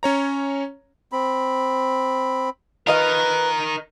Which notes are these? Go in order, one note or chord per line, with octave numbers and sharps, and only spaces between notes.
C#4 C#5 A#5
C4 B5
D#4 F4 A#4 B4 D#5 F5